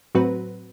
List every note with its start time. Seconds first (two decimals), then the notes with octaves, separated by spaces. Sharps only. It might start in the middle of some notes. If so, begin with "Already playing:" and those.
0.15 A2 F#3 C4 F#4 B4